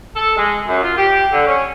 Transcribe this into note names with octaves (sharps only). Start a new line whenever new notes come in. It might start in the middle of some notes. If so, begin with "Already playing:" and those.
A4
G#3
F#2
F4
G4
D3
C#4